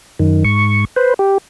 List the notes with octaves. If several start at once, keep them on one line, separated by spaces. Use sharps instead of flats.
F#2 D#3
G#2 C#6
B4 C5
G4